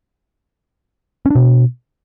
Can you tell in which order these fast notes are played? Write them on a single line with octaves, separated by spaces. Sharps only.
C#4 D4 B2